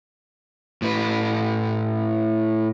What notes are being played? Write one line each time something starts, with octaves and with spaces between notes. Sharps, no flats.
A2 B4